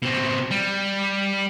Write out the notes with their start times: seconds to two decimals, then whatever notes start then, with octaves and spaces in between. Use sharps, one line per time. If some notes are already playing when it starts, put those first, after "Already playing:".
0.02 B2 C4
0.51 G3